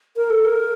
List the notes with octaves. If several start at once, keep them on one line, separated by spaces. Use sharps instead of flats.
A#4
A4
A#4